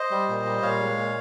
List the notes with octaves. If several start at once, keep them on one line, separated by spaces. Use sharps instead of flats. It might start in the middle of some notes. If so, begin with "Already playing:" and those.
Already playing: C5 D#5
G3
A#2
G3
A#2 C#5 F5
G#3
A#2